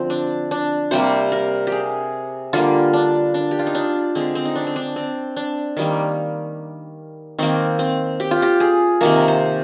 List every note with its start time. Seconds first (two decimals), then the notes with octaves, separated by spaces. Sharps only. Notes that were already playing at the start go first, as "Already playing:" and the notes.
Already playing: D3 F3 C4
0.10 D4
0.51 D4
0.91 C3 G3 A#3 C5
1.32 A#4
1.67 G4
1.72 G#4
2.53 D3 G3 A#3 F4
2.93 D4
3.34 D4
3.51 G4
3.59 F4
3.67 D#4
3.75 D4
4.15 D3 G#3 C4
4.35 C4
4.45 D#4
4.56 D4
4.67 C4
4.76 D4
4.96 C4
5.37 D4
5.77 D#3 G3 A#3
7.39 D#3 A#3 C4
7.79 C4
8.20 G4
8.31 F4
8.42 G4
8.60 G#4
9.01 C3 D#3 A#3 A#4
9.28 C5